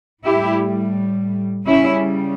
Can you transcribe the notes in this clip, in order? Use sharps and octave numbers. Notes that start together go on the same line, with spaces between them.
A2 G3 E4 G4
C#3 G3 C#4 E4